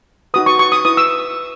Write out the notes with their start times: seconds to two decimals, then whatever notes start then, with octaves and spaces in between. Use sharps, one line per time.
0.34 D#4 F#4 B4 D#6
0.46 C#6
0.59 C#6
0.72 D#6
0.85 E4 B4 D#6
0.97 E6